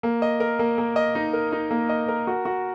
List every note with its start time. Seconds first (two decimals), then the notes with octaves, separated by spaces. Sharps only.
0.03 A#3
0.22 D#5
0.40 A#4
0.59 A#3
0.78 A#3
0.96 D#5
1.15 D#4
1.33 A#4
1.52 D#4
1.71 A#3
1.89 D#5
2.08 A#4
2.27 F#4
2.45 F#4